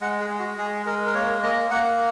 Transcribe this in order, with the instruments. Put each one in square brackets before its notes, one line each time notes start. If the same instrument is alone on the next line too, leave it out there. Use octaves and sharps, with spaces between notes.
[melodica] G#3 F#5
G#4
G#3
F#4
G#3 G#4
G#3 A#4
A#4
A#3 C#5
A#3 D#5
A#3 F#5